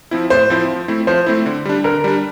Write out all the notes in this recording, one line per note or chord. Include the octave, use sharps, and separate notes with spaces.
F3 C4 E4
A2 C5
F3 C4 E4
F3
A3 C4 E4
F3 C5
A3 C4 E4
D3
G3 D4
D3 A#4
G3 D4